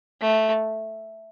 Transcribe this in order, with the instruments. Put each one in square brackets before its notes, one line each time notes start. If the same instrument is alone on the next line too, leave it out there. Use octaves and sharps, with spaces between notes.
[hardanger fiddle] A3